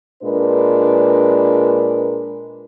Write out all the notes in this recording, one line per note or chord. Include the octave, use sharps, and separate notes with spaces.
A#2 G#3 D4 A#4 B4